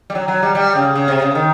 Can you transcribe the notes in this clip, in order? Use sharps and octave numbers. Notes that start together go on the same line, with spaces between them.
G3
F#3
F#3
G3
G3
C#3
C#3
C3
C#3
D#3